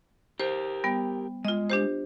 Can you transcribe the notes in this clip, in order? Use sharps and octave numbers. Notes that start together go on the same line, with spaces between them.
G4 A#4 C5
G3 B3
G#3 F4 D#5
D4 G4 C5